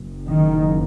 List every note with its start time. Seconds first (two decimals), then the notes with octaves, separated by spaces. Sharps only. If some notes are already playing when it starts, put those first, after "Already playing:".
Already playing: F#1 F#2
0.29 D#3